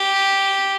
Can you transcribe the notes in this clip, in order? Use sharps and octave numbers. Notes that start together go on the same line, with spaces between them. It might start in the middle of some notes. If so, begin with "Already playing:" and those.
Already playing: G4